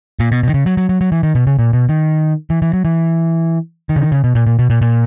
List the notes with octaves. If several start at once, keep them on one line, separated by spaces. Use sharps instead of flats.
A#2
B2
B2
D#3
C#3
F#3
F#3
F#3
F#3
E3
D#3
B2
C#3
A#2
B2
D#3
E3
E3
F#3
E3
D#3
C#3
D#3
C#3
B2
A#2
A#2
B2
A#2
A#2